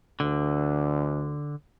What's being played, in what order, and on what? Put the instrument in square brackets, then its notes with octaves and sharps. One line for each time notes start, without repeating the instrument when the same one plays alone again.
[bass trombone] D2 [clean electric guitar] D3